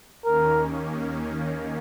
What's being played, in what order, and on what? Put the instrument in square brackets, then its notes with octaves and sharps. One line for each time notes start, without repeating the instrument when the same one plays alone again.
[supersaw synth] D#2 D#3 A#3 C#4 [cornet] A#4